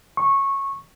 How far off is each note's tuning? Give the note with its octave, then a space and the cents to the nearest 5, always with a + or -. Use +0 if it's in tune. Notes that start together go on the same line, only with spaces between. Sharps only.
C#6 -15